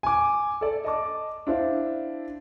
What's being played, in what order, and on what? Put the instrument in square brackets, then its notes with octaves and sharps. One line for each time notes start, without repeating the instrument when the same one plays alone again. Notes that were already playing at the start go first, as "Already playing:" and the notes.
[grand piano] G#5 D6
A4 D5
D#5 A5 D6
D4 E4 C5 F5